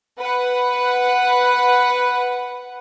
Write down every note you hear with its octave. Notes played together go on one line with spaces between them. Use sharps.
B4 F#5